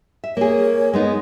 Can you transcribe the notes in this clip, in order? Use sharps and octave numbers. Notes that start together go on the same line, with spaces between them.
E5
A#3 G#4 C#5
G#3 B3 D#4